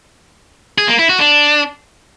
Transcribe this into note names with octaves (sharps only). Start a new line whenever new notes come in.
G#4
A#3
E4
F#4
D4